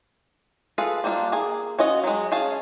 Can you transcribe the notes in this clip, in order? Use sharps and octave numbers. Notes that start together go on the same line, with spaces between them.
F4 G#4 A4 B4 F5
G3 A#3 D4 D#4 F4
A#3 G#4
C#4 F4 F#4 D#5
F#3 G#3
C#4 G#4 F5 A5